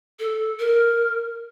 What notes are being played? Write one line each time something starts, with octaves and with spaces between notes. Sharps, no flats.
A4
A#4